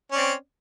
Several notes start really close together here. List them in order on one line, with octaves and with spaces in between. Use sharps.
C#4 D5 C4